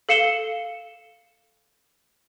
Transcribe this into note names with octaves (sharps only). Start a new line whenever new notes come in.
A4 F5 C#7 E7 G7